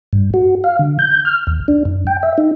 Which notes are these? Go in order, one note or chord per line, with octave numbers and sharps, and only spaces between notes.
G2
F#4
F5
D3
G6
F6
D#2
D4
F#2
G5
E5
D#4